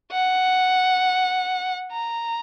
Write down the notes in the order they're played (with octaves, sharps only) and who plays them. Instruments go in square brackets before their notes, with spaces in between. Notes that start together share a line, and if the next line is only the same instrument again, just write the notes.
[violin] F#5
A#5